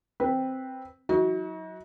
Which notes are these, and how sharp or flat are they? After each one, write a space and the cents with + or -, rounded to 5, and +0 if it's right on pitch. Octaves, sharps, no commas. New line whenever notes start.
C4 +0 B4 -10
F#3 -5 D#4 +45 F#4 +0